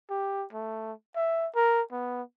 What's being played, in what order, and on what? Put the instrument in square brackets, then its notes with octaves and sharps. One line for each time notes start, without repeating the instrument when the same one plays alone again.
[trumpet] G4
A3
E5
A#4
B3